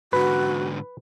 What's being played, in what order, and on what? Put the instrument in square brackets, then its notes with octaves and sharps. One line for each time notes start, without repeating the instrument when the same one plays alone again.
[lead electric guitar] G#2 D3 [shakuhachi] F#4 [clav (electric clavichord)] B4